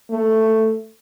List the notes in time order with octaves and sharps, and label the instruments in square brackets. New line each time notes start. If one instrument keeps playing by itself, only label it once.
[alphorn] A3